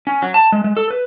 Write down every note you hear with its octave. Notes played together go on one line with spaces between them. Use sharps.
C#4
F#3
A5
G#3
G#3
A4
B4